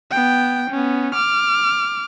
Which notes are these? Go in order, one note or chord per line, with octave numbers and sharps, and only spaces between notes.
B3 G5
B3 C#4
D6 F6